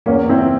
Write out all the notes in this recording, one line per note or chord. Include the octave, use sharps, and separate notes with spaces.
E2 A#3 C#4
E2 C4 E4